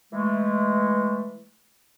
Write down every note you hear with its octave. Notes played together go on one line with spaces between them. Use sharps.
E3 G#3 A3